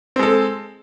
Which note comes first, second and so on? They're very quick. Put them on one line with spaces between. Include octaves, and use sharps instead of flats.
C4 G#3 A4